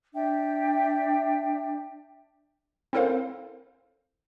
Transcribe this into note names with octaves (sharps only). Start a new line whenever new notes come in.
D4 E5 G5
C4 E4 A4 A#4 C5 F5